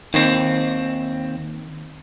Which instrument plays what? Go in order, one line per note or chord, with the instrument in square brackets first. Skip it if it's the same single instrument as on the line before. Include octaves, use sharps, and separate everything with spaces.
[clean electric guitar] D#2 C4 [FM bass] D#3